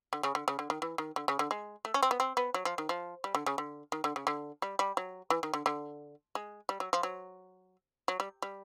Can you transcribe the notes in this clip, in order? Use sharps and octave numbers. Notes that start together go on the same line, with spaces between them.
D3
C#3
D3
C#3
D3
D#3
E3
D#3
D3
C#3
D3
G#3
A3
C#4
C4
B3
C4
B3
F#3
F3
D#3
F3
G3
D3
C#3
D3
D#3
D3
C#3
D3
G3
G3
F#3
E3
D#3
D3
D3
G#3
G3
F#3
F3
F#3
F#3
G3
G3